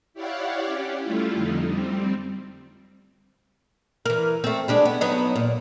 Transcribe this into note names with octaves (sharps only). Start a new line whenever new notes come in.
E4 G4 C#5 D5 F5 F#5
C#4 G4
G3 A3 E4 F4
F2 D3 D#4
G3 C4
E3 A#4
A3 C4
G3 G#3 D4
B3
F#3 B3 D#4
A#2